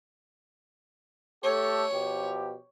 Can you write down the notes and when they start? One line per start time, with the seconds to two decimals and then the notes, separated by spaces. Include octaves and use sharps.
1.44 A3 G4 A4 C#5
1.92 B2 F3 G4